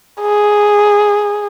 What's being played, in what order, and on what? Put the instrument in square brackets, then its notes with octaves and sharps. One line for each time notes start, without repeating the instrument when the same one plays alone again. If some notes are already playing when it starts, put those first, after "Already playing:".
[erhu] G#4